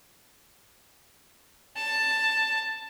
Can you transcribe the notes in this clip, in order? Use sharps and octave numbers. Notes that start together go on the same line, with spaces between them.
A5